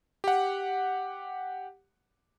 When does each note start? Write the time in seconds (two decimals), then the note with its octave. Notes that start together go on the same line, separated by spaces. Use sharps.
0.24 G4 F#5